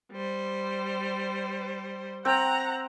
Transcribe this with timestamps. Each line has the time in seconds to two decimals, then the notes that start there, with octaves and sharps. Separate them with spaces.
0.12 G3 C5
2.25 C4 F#5 G5 A#5